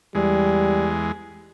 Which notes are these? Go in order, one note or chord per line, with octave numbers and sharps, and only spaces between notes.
E2 G3 G#3